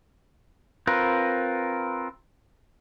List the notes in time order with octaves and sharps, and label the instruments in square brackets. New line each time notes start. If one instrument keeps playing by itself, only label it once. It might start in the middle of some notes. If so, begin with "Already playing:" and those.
[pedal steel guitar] C4 F4 A#4 B4